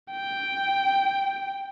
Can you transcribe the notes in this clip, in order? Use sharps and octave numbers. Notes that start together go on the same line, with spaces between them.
G5